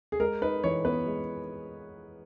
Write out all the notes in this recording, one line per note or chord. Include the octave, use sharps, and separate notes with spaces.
G#4
G#3 A#4
D#4 B4
E3 C#5
B3 B4
G#3